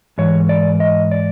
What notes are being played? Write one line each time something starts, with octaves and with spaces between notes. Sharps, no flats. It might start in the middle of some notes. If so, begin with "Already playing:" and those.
G#2 E3 C#5
D5
D#5
D5